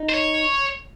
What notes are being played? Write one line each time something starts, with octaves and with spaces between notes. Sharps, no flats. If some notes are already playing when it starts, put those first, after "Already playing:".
Already playing: D#4
C5
C#5